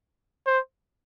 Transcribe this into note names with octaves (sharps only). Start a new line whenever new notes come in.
C5